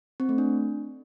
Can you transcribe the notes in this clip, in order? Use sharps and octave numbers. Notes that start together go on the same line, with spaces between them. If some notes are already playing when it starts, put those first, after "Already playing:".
C4
A3
D4